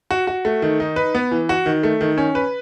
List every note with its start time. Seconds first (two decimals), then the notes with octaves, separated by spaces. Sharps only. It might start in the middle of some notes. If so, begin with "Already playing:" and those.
0.11 F#4
0.27 F#4
0.45 A3
0.62 D#3
0.80 D#4
0.96 B4
1.15 B3
1.31 E3
1.49 F#4
1.66 D#3
1.83 A3
2.01 D#3
2.18 C#4
2.35 B4